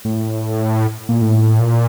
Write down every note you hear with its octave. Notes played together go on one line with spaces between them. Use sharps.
A2
A#2
A2
A#2